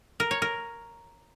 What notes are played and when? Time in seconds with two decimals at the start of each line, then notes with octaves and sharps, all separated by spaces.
0.20 A#4
0.31 C#5
0.42 A#4